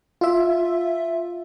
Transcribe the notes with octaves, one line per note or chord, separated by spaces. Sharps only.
F4 E5